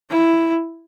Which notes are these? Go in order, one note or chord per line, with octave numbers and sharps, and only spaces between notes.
E4